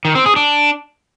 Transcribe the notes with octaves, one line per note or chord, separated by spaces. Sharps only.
D#3
C4
G#4
D4